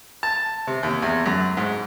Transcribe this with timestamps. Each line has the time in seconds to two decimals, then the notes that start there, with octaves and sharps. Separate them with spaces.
0.23 A5
0.67 C3
0.83 D#2
1.02 E2
1.26 F#2
1.57 G#2